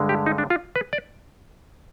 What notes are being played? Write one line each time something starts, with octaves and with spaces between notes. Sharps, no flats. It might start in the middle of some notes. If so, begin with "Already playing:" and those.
Already playing: G2 D3 G#3
G4
D#4
D4
F4
B4
D5